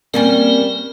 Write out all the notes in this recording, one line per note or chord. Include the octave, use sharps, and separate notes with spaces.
G3 A#3 C4 C#4 A#4